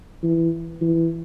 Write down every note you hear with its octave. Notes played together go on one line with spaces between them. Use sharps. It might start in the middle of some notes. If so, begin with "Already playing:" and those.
E3
E3